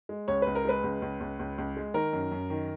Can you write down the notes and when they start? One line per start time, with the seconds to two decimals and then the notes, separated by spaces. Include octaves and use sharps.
0.09 G#3
0.28 C#2 C#5
0.42 C#2 B4
0.55 A#4
0.65 G#3 B4
0.84 C#2
1.02 C#2
1.20 C#2
1.39 C#2
1.58 C#2
1.77 G#3
1.94 D#3 A#4
2.13 F#2
2.31 F#2
2.50 D#3